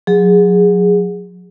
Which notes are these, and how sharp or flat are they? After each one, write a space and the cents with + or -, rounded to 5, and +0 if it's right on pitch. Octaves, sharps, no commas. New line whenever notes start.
F#3 -35 G#4 -15